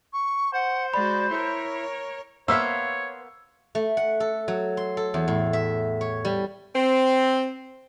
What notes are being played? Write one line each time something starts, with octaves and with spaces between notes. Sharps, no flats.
C#6
C5 F#5
G#3 F#4 D5 B5
E4 A#4 C#5
A#3 B3 C5 C#5 E5 F5 E6
A3
F#5
A4
F#3
C6
A4
E2
A2
E5
C#5
G3
C4